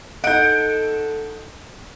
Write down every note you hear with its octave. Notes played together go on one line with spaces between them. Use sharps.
D#4 A4 D#5 F#5 G6 D7